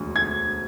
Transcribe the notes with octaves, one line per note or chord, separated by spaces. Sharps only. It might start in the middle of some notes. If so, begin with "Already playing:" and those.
Already playing: E1 D2
G#6